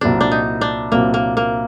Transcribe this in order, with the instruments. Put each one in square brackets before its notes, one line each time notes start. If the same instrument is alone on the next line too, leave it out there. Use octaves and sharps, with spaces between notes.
[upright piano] C2 A#2 F#3 C4 [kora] D4
[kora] D4
D#4
D4
[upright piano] C2 A#2 F#3 C4 [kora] A#3
[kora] A#3
A#3